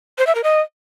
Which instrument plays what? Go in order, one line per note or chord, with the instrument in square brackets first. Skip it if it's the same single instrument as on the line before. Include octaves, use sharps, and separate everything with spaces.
[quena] C5
E5
A#4
D#5